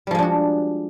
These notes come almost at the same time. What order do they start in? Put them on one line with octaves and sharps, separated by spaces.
G3 F3 G#3 D4 F#4